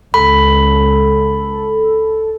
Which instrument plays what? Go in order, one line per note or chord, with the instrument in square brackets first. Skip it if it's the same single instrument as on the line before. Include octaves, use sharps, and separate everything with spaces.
[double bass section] C#2 [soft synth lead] A4 [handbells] B5